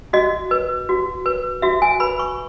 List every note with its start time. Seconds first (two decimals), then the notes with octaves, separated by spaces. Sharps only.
0.13 F#4 D#5
0.51 B4
0.89 F#4
1.26 B4
1.62 F#4 E5
1.82 G#5
2.00 B4 B5
2.19 C#6